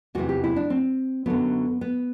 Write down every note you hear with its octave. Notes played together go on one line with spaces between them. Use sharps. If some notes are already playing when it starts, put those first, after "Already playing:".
E2 C3 E3 F#4
G4
E4
D4
C4
F#2 D3 F#3 B3
B3